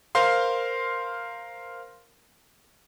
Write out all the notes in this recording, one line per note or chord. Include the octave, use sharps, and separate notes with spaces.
A#4 C5 F5 C6